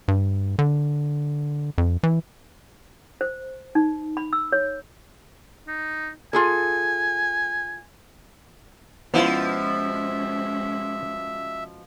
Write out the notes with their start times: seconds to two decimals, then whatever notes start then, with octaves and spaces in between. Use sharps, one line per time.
0.08 G2
0.59 D3
1.78 F2
2.03 E3
3.21 C5
3.75 D#4
4.17 B5
4.33 E6
4.52 C#5
5.67 D#4
6.33 F4 G#4 A4 G#5
9.14 B2 F3 G#3 B3 C#4 E4 F4 E5